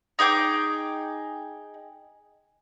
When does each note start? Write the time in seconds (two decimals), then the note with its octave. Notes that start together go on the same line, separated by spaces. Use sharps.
0.19 D#4 G#4 G5 D6